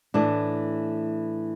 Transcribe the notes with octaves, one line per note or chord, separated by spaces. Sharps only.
A2 E3 A3 D4